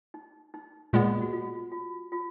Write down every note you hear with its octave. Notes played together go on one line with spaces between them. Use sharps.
D#4
D#4
A#2 G#3 B3 F4
F#4
F4
F4
F4